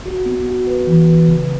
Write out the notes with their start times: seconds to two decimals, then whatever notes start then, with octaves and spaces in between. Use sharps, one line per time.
0.06 F#4
0.26 B3
0.46 F#4
0.67 B4
0.87 E3
1.07 B4
1.28 C#3